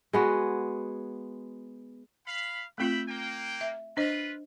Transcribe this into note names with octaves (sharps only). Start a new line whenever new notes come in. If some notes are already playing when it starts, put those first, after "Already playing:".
G#3 B3 F#4
F5 B5
A3 C4 F4 E5 G5 B5
A#3 G5
E5
D4 F4 B4 C5 D#5